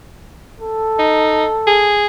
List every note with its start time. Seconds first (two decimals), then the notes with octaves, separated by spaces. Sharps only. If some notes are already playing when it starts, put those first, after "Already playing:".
0.60 A4
0.99 D#4
1.67 G#4